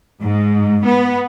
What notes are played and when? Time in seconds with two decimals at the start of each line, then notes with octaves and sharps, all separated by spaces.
0.22 G#2
0.85 B3